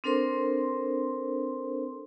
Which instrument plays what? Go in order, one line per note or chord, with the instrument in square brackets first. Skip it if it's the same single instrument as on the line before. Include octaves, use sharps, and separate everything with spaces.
[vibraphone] C4 D4 A4 A#4 C5 C6